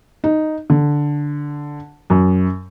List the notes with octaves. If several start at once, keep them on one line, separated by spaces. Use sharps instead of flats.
D#4
D3
F#2